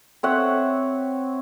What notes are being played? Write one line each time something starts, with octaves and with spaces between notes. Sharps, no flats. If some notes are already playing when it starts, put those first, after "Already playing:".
C4 C#5 E5 F#5